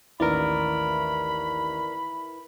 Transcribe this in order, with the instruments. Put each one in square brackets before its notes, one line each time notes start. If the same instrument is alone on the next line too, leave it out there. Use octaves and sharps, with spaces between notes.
[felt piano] A1 D#2 [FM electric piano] E4 B4 E5 [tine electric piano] A#4 D5 [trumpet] B5